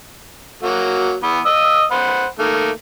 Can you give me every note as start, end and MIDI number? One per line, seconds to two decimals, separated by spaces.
0.63 1.14 54
0.63 1.14 58
0.63 1.14 66
1.23 1.40 52
1.23 1.40 59
1.46 1.84 75
1.46 1.84 87
1.46 1.84 88
1.91 2.26 72
1.91 2.26 78
1.91 2.26 83
2.39 2.70 51
2.39 2.70 57
2.39 2.70 58